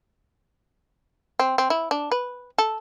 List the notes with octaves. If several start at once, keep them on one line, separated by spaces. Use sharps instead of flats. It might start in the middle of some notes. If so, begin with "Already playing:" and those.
C4
C4
E4
D4
B4
A4